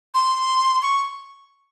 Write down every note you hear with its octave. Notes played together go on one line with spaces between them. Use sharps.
C6
C#6